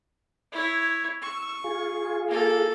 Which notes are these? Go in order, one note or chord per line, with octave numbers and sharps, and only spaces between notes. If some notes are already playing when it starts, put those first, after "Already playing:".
E4 C#5
C#6 E6
F4 G#4
A#3 A4